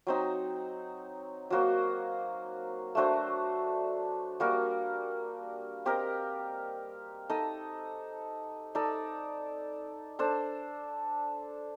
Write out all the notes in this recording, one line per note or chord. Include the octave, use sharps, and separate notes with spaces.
F#3 C4 D#4
F#3 A#3 F#4 C5
A3 D4 F#4 C5
G3 A#3 F#4 A#4
C4 G4 A#4 D#5
D#4 A4 D#5
D#4 A4 D5
D4 A4 C5